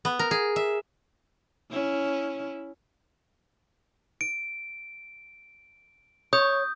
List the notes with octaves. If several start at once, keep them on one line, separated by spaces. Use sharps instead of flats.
B3
A#4
G#4
E5
C#4 E4
D7
C#5 D#6 G6